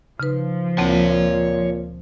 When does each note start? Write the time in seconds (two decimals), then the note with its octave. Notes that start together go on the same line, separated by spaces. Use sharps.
0.20 C#3 F3 D#4 B4
0.78 D2 A#2 C4 C#5 A5